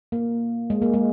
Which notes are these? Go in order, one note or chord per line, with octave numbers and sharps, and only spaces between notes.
A#3
G#3
A#3
G#3